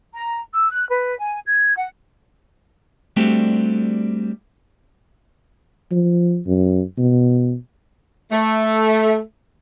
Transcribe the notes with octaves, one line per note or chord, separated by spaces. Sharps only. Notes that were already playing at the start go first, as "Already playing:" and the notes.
A#5
E6
F#6
B4
G#5
G#6
F#5
G3 A3 C4 D4 F#4 G4
F3
F#2
B2
A3